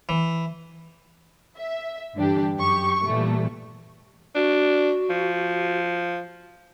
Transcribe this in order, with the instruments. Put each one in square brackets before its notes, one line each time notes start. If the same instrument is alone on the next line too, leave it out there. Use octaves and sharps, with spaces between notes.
[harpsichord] E3
[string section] E5
G2 D3 E3 D4 G4
F#2 G4 C#6
A#2 E3 G3 A3
[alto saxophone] D4 [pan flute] F#4
[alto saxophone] F3